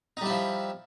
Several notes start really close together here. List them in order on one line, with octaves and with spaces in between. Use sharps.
D#4 G3 E4 F3